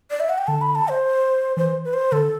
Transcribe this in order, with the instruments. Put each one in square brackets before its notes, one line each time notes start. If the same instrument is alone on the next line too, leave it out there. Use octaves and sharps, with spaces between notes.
[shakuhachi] D5
E5
F#5
G5
[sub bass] D3 [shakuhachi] A5
[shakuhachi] B5
A5
C5
[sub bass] E3 [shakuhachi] C5
[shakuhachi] B4
C5
[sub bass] D3 [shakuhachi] A4